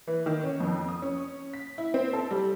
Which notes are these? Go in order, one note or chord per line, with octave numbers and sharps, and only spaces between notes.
E3
D#3
C#4
F2
D#6
C#4
B6
E4
C4
A4
G3